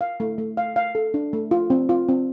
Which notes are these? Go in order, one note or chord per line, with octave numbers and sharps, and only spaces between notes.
F5
A3
A3
F5
F5
A4
D4
A3
F4
C4
F4
C4